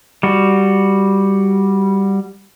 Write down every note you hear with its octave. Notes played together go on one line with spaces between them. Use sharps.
G3 F#4